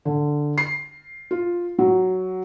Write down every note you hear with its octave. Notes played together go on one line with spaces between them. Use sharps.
D3
C7
F4
F#3